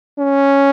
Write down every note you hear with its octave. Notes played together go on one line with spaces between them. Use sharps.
C#4